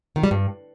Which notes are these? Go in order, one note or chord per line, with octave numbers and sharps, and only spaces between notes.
D#3
G3
G2